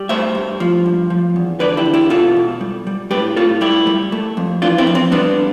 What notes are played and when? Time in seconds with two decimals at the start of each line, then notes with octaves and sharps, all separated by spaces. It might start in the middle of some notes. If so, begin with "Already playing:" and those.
Already playing: G3
0.09 A3 C5 E5
0.35 G2
0.60 F3
0.86 G2
1.10 F3
1.36 E2
1.60 D3 B4 D5
1.77 E4 G4
1.86 E2
1.94 E4 G4
2.10 B2 F4 A4
2.36 B2
2.61 G3
2.87 G3
3.11 A2 G4 B4
3.36 A2 F4 A4
3.61 G3 E4 G4
3.87 G3
4.12 A3
4.37 F2
4.62 E3 D4 F4
4.78 C4 E4
4.87 F2
4.95 C4
5.12 G3 B3 D4